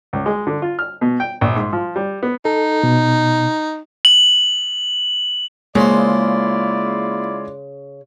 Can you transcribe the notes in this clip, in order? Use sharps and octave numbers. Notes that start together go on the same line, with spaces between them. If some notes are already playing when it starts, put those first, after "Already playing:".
C#2
G#3
D3
F4
F6
B2
G5
A#1
G#2
F3
G3
B3
D#4 A4
B2
F#7
C#3 G#3 A#3 D4 E4 F4 C5 D5